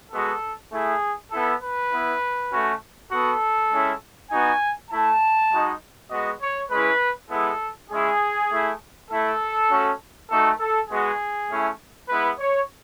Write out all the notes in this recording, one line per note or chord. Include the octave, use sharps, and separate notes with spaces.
G#3 B3 F#4 A4
A3 E4 G#4
B3 E4 A4
B4
B3 E4
A3 C#4 F#4
B3 F#4 A4
G#3 C#4 E4
B3 D#4 F#4 G#5
A3 E4 A5
G#3 D#4 F#4
G#3 B3 F#4 D#5
C#5
G#3 C#4 E4 B4
G#3 B3 E4 A4
G#3 C#4 E4 G#4
A3 E4
A3 E4 A4
A3 C#4 F#4
A3 D#4 F#4 A4
A4
G#3 B3 F#4 G#4
A3 C#4 E4
G#3 B3 E4 B4
C#5